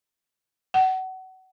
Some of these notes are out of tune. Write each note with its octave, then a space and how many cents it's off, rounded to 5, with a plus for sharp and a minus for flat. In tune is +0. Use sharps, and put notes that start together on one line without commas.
F#5 +25